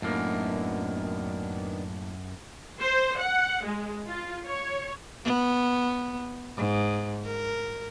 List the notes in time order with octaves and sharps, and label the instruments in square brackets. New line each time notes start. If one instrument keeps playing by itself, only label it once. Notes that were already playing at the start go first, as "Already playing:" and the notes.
[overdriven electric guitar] F#2 [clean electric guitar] A2 A#3 [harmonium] D#3 B3 D4
[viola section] C5
F#5
G#3
F4
C#5
[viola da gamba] B3
G#2
A#4